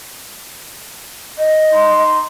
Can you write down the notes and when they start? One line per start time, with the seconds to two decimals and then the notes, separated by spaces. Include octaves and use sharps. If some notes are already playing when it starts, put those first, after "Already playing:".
1.38 D#5
1.72 D#4 C6